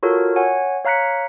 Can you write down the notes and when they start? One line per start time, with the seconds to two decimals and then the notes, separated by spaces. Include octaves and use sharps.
0.03 F4 F#4 A4 A#4 C#5
0.36 C#5 F#5 G#5
0.85 C#5 F5 A#5 F#6 B6 C#7